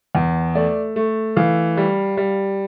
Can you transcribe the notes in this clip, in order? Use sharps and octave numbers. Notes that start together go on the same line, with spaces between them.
E2
A3 D5
A3
E3 F5
G3
G3